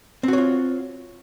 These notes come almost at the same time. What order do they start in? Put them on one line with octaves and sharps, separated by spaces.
C4 F#4 C#5 F4